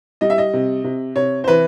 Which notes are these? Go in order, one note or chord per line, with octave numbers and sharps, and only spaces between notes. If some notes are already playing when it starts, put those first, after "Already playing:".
G3 D#5
E5
D#5
C3
C3
C3 C#5
C5
E3 B4